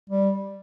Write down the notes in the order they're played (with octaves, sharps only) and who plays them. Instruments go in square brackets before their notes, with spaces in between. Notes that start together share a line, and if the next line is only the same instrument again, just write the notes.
[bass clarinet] G3